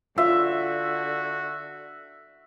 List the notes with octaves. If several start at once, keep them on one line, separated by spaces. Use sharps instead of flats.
D3 F4 F#4 E5